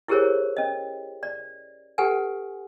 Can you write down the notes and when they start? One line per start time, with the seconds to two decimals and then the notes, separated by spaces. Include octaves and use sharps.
0.08 E4 G4 G#4 A#4 C5 C#5
0.57 C#4 D#5
1.23 D5
1.98 G4 A4 B4 F#5 G#5